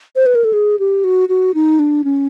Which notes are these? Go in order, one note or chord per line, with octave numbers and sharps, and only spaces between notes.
C5
B4
A#4
A4
G#4
G4
F#4
F#4
D#4
D4
C#4